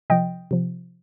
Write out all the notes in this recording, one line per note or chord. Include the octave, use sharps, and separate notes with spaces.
C3 F3 D#5 G5
C3 F3